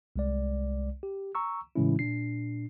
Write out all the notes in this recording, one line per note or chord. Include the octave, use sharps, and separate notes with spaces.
C2 G#3 D5
G4
A#5 C#6 E6
A2 C#3 E3 G#3 C#4 E4
A#2 D4 C7